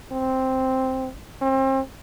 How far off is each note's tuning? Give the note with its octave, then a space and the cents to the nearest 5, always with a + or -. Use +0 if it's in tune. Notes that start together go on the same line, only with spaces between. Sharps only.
C4 +0
C4 +35